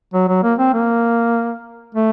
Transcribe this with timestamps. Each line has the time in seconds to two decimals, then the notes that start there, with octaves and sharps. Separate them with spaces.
0.14 F#3
0.28 F#3
0.43 A#3
0.58 C4
0.74 A#3
1.95 A3